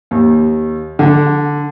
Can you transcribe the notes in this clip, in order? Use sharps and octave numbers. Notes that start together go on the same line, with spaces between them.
D#2
D3